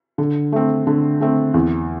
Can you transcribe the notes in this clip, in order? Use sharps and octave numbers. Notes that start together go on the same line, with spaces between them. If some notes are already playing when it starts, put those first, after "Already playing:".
D3
A3 C4
D3
A3 C4
E2